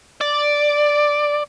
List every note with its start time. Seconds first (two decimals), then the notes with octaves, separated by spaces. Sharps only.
0.21 D5